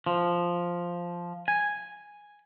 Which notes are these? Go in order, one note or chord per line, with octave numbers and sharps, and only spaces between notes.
F3
G#5